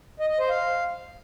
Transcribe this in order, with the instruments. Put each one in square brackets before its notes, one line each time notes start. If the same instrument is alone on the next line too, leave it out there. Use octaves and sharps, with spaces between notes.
[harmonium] D#5
D#5
C5
F5